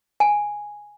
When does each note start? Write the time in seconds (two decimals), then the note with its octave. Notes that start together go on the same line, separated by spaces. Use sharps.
0.20 G#5